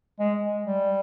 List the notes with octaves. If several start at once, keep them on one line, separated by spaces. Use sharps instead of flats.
G#3
G3